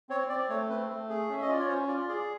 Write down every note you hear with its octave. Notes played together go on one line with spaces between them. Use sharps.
C4 C#5
C4 D5
A3 C#5
C4 B4
A3
G#4
C#4 E5
D#5
F4 D5
C#5
C#4 C5
F4 D5
G#4 D5